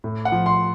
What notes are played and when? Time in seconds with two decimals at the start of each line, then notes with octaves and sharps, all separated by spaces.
0.04 A2
0.25 F#5
0.32 F3
0.46 C6